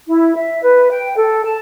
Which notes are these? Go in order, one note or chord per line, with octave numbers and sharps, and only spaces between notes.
E4
E5
B4
G5
A4
A5